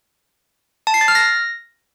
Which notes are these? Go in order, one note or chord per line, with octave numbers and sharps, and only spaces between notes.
A5
C7
A6
F6
A#6